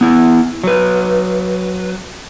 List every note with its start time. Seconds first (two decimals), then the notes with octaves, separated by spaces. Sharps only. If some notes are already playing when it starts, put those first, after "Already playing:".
0.01 B3 E4
0.64 F#3 B4